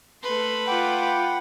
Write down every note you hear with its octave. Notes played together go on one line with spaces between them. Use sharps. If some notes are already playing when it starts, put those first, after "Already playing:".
A3 B4 C6
F4 F#5 G5 B5 D6